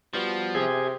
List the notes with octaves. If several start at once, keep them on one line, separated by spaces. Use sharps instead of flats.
F3 G3 B3 F#4
C3 G#4 E5 G6 G#6